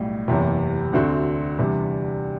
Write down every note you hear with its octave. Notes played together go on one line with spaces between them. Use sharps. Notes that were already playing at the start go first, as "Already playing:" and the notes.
Already playing: B1 A2 G3
F#1 E2 C3
D2 D3 A3 C4 F#4
E2 C3 G3 D4